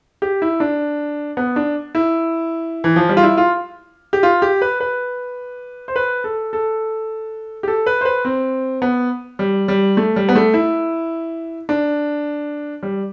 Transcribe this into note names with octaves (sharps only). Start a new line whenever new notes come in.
G4
E4
D4
B3
D4
E4
E3
F3
G3
F4
E4
F4
G4
F4
G4
B4
B4
C5
B4
A4
A4
G4
A4
B4
C5
B4
C4
B3
G3
G3
A3
G3
B3
A3
E4
D4
G3